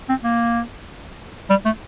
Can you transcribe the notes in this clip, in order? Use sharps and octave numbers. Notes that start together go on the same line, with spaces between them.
C4
A#3
G3
A3